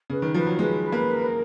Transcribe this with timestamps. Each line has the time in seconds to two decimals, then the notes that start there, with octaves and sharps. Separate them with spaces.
0.10 C#3 B4
0.22 D#3
0.34 F3 B4
0.47 F#3
0.59 G#3 B4
0.83 B4
0.92 A#3
1.09 A#4